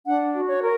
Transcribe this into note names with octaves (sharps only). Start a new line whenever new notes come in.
D4 F#5
F#4
C#5
A#4